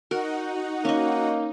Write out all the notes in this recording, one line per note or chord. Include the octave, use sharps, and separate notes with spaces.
D#4 F#4 A#4 F#5
A#3 C#4 D#5